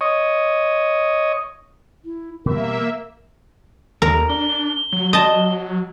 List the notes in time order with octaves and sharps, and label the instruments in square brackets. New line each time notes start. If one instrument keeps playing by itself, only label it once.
[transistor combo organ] C#5 D#5
[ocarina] E4
[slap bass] B2 E3 G3 [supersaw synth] A#3 E5 [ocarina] A#4
[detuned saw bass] D#2 [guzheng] A#4
[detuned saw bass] D4 [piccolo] G7
[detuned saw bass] F#3
[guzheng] D#5 A5